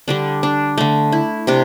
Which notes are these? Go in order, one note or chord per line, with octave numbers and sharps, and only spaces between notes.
D3 G3 D4
D4
D3 A3
E4
C3 D4 G4